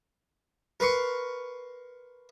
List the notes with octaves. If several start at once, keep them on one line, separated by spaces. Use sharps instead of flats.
A#4 B4 C6 C#6